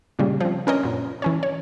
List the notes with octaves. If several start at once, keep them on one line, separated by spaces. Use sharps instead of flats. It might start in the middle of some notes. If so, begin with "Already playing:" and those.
A#2 C#3 G3
F3 C4
C#4 D4 A#4 B4 C#5 D#5
F#2 A#2
E3 C#4 C#5
C#5